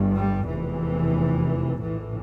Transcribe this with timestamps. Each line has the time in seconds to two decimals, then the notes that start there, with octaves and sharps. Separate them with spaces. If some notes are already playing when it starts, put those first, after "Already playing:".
Already playing: G1 G2
0.15 G3
0.47 F1 E2 C3 E3
1.80 A#1 A2 E3